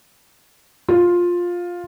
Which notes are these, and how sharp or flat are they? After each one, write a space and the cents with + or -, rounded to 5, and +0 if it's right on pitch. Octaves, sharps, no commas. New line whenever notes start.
F4 +10